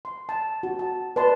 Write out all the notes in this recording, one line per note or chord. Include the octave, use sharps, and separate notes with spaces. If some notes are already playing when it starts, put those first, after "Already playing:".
C6
A5
F#4
A5
B4 D5 A5 C6